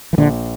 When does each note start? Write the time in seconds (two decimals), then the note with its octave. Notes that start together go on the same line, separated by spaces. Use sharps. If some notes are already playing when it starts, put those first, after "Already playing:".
0.13 E3
0.18 A#1 D3